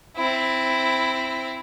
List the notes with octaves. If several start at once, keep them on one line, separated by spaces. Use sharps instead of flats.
C4 E4